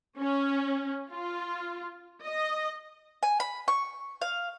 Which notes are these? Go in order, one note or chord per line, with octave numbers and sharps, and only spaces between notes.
C#4
F4
D#5
G#5
B5
C#6
F5